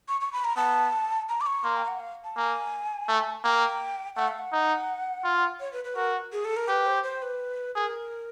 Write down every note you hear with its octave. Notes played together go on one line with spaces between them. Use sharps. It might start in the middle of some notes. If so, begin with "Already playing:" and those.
C#6
C#6
B5
A#5
B3 A5
A#5
D6
C#6
A#3 C6
G5
F5
F#5
F5
A5
A#3 G#5
A3
A#3 G5
A3 F#5
F5
F#5
D#4
F4
C#5
B4
B4
F#4 A#4
G#4
A4
A#4
G4 B4
C5
C5
B4
G#4 A#4